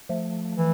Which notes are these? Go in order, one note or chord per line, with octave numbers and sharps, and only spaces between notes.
F3 A3
E3